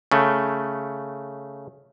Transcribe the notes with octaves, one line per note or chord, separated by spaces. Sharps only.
C#3 A3